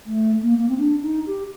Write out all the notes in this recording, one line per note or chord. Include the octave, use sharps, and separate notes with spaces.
A3
A#3
A#3
C4
D4
D#4
G4